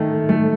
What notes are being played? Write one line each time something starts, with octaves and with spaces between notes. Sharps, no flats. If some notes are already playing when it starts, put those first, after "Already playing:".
Already playing: D#3 A3
A3